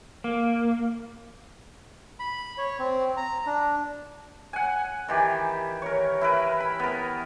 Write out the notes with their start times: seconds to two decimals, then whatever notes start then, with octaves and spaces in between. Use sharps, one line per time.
0.24 A#3
2.20 B5
2.58 C#5
2.79 C4
3.17 A#5
3.46 D4
4.53 F#5 G#5
5.08 D#3 E3 G4
5.82 A#4 C#5
6.21 E4 A#4 B4
6.60 B5
6.80 B3 A#4